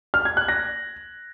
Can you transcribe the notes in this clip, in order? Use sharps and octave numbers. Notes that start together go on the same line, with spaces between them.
F6
G#6
F#6
A#6